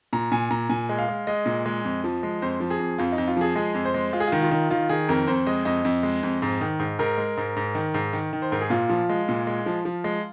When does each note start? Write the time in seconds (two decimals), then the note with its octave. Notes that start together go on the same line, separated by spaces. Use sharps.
0.13 A#2 A#5
0.32 A#2 G#5
0.51 A#2 A#5
0.70 A#2 G#5
0.89 G#3
0.98 F5
1.09 G#3
1.27 G#3 D#5
1.46 A#2
1.66 G#3
1.85 F2
2.04 F3
2.23 G#3
2.42 F2 C5
2.60 F3
2.70 G#4
2.80 F2
2.98 F2 F4
3.12 D#4
3.18 F2
3.27 F4
3.37 F3 G#4
3.56 G#3 G#4
3.74 F2
3.85 C5
3.94 G#3
4.13 G#3 F4
4.20 G#4
4.27 D#3 F4
4.42 F4
4.51 D#3
4.70 D#3 F4
4.89 D#3 G#4
5.09 F2 A#4
5.27 F2 C5
5.47 G#3 D#5
5.65 F2 D#5
5.85 F2
6.03 G#3
6.23 F2
6.42 G#2
6.61 D#3
6.79 G#2
6.99 G#2 A#4
7.18 G#3
7.37 G#2
7.56 G#2
7.75 D#3
7.94 G#2
8.13 D#3
8.33 D#3
8.42 C5
8.52 G#2 A#4
8.61 G#4
8.70 A#2 F4
8.89 F3
9.09 G#3
9.29 A#2
9.47 G#3
9.66 F3
9.85 F3
10.04 G#3